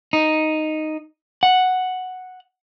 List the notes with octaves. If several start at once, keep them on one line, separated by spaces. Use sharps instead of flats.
D#4
F#5